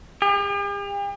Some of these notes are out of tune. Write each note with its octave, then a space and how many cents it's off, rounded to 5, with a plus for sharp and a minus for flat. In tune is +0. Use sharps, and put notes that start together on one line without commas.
G4 +45